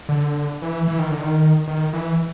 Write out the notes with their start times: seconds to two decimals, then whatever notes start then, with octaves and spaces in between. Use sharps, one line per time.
0.09 D3
0.62 E3
0.88 E3
0.99 D#3
1.11 D3
1.21 D#3
1.67 D#3
1.93 E3